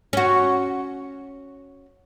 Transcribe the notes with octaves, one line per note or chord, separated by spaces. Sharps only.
C#4 F#4